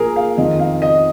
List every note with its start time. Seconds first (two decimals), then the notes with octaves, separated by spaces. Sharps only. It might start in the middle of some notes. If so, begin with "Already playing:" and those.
Already playing: A#2 F3 G#4 A#4
0.16 F5
0.37 F2 D#3 D#5
0.59 F5
0.82 D#5